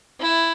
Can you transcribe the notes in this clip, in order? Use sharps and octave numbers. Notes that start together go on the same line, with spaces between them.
E4